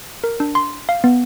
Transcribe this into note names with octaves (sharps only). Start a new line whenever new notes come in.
A#4
D4
C6
F5
B3